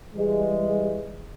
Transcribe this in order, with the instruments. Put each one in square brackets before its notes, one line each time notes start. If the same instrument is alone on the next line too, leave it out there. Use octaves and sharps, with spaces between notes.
[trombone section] E3 G3 G#3